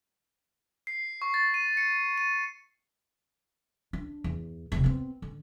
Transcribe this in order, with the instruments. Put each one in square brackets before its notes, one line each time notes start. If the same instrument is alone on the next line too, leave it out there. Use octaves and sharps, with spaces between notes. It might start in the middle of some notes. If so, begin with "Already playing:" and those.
[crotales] C7
C#6
A6
D#7
C#7
D#7
[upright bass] D4
E2
E1 C3
B3 C4
D3